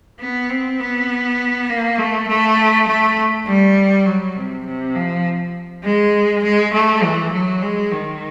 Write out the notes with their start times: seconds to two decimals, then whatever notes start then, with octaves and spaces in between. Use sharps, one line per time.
0.20 B3
0.50 C4
0.80 B3
1.70 A#3
1.99 A3
2.28 A3
2.88 A3
3.47 G3
4.06 F#3
4.36 C3
4.66 C3
4.95 F3
5.84 G#3
6.44 G#3
6.73 A3
7.03 E3
7.32 F#3
7.62 G#3
7.92 D#3